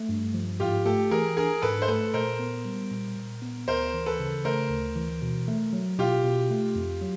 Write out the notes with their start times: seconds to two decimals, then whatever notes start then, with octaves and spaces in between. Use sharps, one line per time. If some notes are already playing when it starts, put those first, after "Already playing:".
Already playing: A3
0.09 G2
0.34 F3
0.60 G#2 F4 G4
0.85 A3 G4 A4
1.11 E3 G#4 A#4
1.37 D4 G#4 A#4
1.62 G#2 A4 B4
1.82 C5
1.88 A3 A4 B4
2.14 A#2 A#4 C5
2.39 B3
2.65 G3
2.91 A#2
3.16 A#2
3.42 B3
3.67 D2 A#4 C5
3.94 E3
4.06 A4 B4
4.20 C#3
4.45 A3 A#4 C5
4.70 D2
4.96 E3
5.22 B2
5.48 A3
5.73 F#3
5.99 B2 F4 G4
6.24 B2
6.50 A3
6.75 F2
7.01 F#3